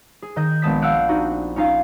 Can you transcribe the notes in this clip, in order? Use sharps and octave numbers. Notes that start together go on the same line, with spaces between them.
G#4
D#3 D#5 D#6 G6
A#1 G#3 B3 A5 D#6 B6
F5 F#5 E6 F#6 G6 D7
C4 D4 D#4 F#4
C#4 D#4 F4 F5